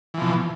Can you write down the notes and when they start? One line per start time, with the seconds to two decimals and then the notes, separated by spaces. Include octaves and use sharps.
0.14 E3
0.18 F3
0.21 B2